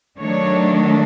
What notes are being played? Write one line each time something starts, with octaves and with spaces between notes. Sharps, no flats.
D#3 F#3 A3 D4 C#5